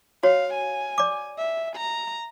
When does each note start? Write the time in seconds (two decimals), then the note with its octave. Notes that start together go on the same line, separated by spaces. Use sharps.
0.23 F#4 C#5 F5
0.54 G#5
0.98 D5 D6
1.38 E5
1.76 A#5